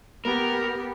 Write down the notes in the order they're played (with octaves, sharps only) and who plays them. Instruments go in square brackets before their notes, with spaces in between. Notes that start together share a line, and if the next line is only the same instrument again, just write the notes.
[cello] B3 G4 [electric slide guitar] A#4